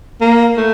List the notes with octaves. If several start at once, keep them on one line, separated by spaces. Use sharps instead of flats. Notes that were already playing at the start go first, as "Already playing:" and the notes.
A#3
A3